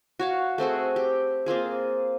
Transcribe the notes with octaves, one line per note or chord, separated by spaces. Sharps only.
F#4 C#5 F5
A3 C4 F#4 G#4
G4
A#3 C4 F4 G#4